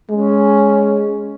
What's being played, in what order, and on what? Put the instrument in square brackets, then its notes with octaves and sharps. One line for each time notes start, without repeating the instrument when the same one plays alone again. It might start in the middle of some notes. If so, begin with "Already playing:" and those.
[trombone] G#3 [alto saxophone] C#4